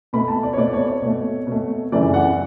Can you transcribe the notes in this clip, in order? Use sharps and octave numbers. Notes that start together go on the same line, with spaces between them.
B2 A3 B5
A5
D5
C#5
B2 A3 D5
C#5
C#5
B2 A3
B2 A3
F#2 C#3 E3 A3 D5
F#5